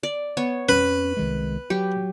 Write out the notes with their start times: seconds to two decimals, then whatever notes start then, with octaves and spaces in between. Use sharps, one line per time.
0.03 D5
0.37 B3 C#5
0.69 F2 C#4 B4
1.17 C2 D#3 G#3
1.70 F#3 G4